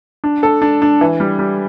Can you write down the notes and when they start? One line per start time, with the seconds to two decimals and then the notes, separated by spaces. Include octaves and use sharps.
0.24 D4
0.43 A4
0.62 D4
0.82 D4
1.01 E3
1.20 G3
1.39 G3